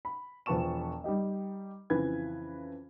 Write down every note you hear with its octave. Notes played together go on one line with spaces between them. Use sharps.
B5
E1 F3 B4 A5 C#6 E7
G3 D#4 G4 D#5
F2 C#3 E3 B4 G#6